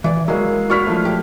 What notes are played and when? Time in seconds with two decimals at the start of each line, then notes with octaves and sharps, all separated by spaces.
0.04 E3 D5
0.28 F#3 G#3 A#3 E4 F5
0.70 E4 F#4 D5 C#6 F6 B6
0.87 F3 A3
1.05 G4